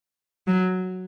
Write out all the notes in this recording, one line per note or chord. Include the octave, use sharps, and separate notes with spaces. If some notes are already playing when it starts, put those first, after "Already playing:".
F#3